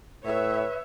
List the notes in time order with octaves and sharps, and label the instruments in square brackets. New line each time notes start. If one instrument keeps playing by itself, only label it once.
[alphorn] A2 [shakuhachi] B4 [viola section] C#5 E5